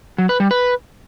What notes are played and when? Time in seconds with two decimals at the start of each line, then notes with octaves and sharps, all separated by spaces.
0.18 F#3
0.29 B4
0.40 G3
0.51 B4